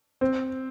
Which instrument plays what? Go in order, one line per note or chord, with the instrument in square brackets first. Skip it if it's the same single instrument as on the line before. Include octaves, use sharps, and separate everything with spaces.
[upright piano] C4